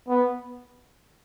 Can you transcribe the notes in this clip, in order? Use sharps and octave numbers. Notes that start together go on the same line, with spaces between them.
B3